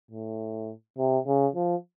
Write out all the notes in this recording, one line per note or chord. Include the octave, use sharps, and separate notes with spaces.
A2
C3
C#3
F3